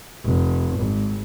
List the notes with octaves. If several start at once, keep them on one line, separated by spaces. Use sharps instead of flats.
F1
G#1